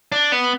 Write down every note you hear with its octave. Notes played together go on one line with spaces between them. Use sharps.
D4
B3